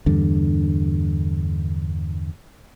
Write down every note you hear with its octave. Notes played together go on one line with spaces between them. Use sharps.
E2 G2 D3